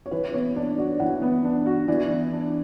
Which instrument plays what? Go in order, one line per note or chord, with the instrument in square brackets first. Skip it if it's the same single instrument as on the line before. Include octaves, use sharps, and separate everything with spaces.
[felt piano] C#5
[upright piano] E3 [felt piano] B4
[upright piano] B3 [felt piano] C#5
[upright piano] D4 [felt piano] D5
[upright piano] F#4 [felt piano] D5
[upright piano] E3 [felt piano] F#5
[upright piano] B3
D4
F#4
[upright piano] E3 [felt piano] D5
[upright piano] B3
D4